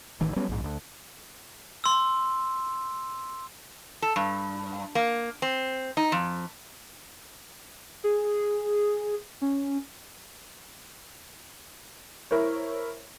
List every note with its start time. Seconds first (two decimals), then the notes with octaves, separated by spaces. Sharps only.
0.21 A1 D#3 E3
0.36 F#3 G3 B3 C#4
0.49 A#1 G#2
0.64 D2
1.84 C6 E6
4.02 A4
4.16 G2
4.95 A#3
5.42 C4
5.97 D#4
6.12 F2
8.04 G#4
9.41 C#4
12.31 E4 A#4 C5 C#5